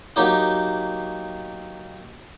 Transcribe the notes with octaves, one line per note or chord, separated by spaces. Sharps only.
F#3 A#3 D#4 G4 D#5